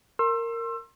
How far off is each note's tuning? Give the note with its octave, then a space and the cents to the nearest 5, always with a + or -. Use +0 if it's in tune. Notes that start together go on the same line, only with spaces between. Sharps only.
A#4 -15 C6 +30 E6 +25